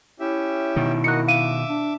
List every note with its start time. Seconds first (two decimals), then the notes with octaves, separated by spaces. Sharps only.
0.20 C#4 E4 G4 E5
0.76 B2 D#3
1.04 A#3 F#4 D#5 F#6 C#7
1.28 E5 F5 D6 D#7
1.69 D4